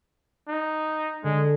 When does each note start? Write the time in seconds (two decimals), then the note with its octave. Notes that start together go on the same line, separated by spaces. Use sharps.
0.49 D#4
0.88 A#6
1.24 D3 G#3